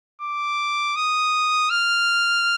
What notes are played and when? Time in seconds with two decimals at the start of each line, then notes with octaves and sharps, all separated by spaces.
0.22 D6
0.96 D#6
1.70 F6